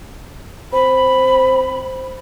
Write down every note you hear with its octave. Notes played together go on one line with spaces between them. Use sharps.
C4 B5